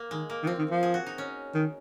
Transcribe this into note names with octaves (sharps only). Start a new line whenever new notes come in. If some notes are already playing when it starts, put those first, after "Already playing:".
Already playing: A#3
D#3 G#3
A#3
D#3
F3 C4
D#3
F3
G#4
F#4
D#4
C#4
D#3